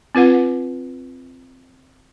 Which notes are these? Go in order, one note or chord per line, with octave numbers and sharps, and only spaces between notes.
C4 F4 B4 F#5